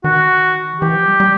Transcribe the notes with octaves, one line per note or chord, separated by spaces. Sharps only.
D#3 F#4
E3 G4
F3
G3
G3